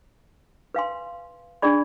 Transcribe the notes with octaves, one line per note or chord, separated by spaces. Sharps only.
B4 F5 G#5 C6
D4 G#4 D5 G#5 B5